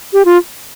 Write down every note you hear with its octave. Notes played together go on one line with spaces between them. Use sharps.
G4
F4